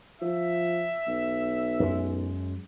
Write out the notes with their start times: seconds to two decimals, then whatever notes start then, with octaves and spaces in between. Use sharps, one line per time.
0.22 F3 E5
1.07 B1
1.80 F#2 G#3